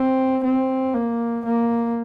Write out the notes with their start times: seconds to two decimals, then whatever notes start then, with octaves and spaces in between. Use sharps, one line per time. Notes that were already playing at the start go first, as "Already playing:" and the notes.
Already playing: C4
0.44 C4
0.94 A#3
1.45 A#3